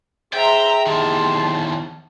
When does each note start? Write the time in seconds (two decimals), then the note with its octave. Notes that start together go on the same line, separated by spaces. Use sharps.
0.33 G#2 G#4 E5 G5 A#5 C6
0.86 E2 D#3 G4 A5 C6